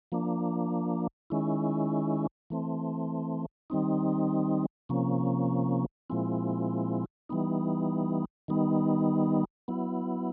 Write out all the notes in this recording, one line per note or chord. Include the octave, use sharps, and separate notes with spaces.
F3 A#3 D4
D#3 G#3 C#4 E4
E3 A3 C4
D#3 G3 C4 D#4
C3 F3 A#3 C#4
A#2 F3 G#3 C4 E4
E3 G3 B3 D#4
D#3 G3 B3 D#4
F#3 B3 E4